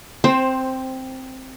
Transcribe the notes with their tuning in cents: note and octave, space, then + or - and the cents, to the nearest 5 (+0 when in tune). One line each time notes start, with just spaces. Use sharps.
C4 +0 C5 +15